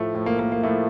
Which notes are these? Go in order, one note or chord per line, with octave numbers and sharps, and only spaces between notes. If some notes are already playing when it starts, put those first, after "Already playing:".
Already playing: A2 F3 A3
A2 F3
A#3
A#3
A#3
A2 F3 A3